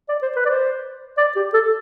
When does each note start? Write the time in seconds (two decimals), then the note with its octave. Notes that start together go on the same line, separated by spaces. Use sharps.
0.09 D5
0.22 C5
0.36 B4
0.45 D5
0.49 C5
1.17 D5
1.36 G4
1.54 A4